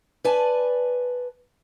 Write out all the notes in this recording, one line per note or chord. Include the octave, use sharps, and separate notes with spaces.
B4 D5 G#5 A5